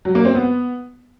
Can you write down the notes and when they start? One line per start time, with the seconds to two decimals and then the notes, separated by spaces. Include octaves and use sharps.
0.05 F#3
0.15 A#3
0.25 C4
0.35 B3